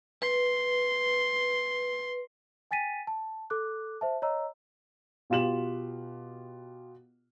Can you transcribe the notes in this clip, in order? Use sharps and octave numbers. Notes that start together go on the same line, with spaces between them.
B4 C6
G5 G#5 A6 B6 D#7
A5
A4 D6 F#6
C5 E5 A5
C#5 D#5 A#5 E6
B2 F4 G4 E7 F#7